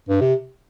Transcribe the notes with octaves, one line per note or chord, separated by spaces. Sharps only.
G2
C3